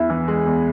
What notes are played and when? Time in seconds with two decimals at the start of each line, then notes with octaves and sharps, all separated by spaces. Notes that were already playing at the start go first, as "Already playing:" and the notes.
Already playing: E2 E4 E5
0.10 E3
0.28 G#3
0.46 E2